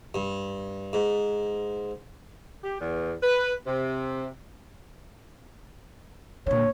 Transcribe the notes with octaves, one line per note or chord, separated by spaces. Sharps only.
G2
G#2
G4
E2
B4
C3
A#2 D3 C#5